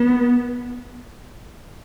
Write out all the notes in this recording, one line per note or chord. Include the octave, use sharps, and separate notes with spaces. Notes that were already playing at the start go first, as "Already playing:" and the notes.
Already playing: B3